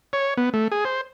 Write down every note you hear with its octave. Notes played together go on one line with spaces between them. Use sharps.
C#5
B3
A3
G#4
C5